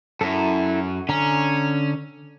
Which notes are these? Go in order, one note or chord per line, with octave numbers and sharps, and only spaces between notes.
F#2 E4 A4
D3 C#4 A#5